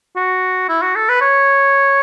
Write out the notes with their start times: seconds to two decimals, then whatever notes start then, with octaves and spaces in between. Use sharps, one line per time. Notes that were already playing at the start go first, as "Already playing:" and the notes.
0.16 F#4
0.69 E4
0.82 F#4
0.96 A4
1.09 B4
1.21 C#5